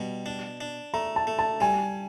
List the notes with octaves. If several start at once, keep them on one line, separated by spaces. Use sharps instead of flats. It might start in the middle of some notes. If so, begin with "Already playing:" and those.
Already playing: B2 G3
D4
D4
A3 A#5
A5
A3
A5
G3 G#5